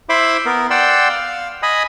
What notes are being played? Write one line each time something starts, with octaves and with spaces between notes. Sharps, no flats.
E4 C5 E5 B5 C6 D6
B3 A#4
D5 F#5 G5 C6 E6
F5
D#5 G#5 B5 D#6